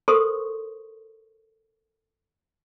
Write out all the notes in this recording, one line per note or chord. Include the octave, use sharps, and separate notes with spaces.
A4 A#4 C5 C6 C#6 D#6